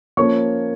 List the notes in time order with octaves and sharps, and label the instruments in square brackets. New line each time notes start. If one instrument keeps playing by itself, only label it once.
[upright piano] F3 A#3 C#4 C#5 C#6